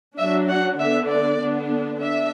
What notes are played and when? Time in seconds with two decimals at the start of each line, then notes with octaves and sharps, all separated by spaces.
0.17 F#3 D4 E5
0.48 F#5
0.79 D3 B3 D4 E5
1.10 D5
1.40 D3 B3 D4
2.02 D4 E5